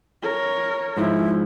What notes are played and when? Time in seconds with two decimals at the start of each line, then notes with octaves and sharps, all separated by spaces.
0.22 A#4 C#5
0.97 G#2 F3 E4